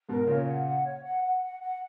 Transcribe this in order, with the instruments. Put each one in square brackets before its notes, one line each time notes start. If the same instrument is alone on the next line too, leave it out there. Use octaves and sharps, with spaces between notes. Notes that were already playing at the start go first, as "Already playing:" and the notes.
[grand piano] G#2 B2 [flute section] A#4
[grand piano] A#2 C#3 [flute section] C#5
[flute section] F#5
F#5
C#5
F#5
F#5
F#5
F#5